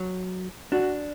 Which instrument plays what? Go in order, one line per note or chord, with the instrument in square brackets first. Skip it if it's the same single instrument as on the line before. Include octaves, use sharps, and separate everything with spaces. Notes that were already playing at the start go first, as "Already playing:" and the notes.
Already playing: [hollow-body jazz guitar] F#3
[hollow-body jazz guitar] D4 [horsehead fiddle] F#4